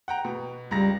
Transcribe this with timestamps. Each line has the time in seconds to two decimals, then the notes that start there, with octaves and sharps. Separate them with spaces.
0.08 F#5 G5 A#5
0.25 B2
0.71 C#2 G3 A#5 A#6